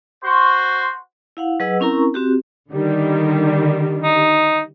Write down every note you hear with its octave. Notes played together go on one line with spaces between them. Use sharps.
F#4 C5 C6 C#6
E4 F5 F#5
F#3 G#4 B4 D#5 F#5 E6
C4 C#4 E4 A#4 A#5 C#6
C4 F#4 G4
D3 D#3 G3
D#4